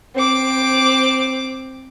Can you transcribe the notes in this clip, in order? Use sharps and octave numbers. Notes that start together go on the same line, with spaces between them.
C4 D6